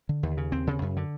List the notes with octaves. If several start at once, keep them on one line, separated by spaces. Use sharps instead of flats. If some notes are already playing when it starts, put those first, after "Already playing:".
D3
D#2
C#3
D#2 C4
C#3
F#2
D3